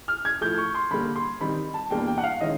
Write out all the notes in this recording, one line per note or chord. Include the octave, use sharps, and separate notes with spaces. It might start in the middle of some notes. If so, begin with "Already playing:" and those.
F6
G#6
A2 F3 A3 G6
C#6
C6
D3 G3 A#3 B5
C6
D#3 G3 C4 D#4 B5
A5
E2 B2 G3 A#3 D4 G5
G5
F#5
F5
D#3 G#3 C#4 E4 D#5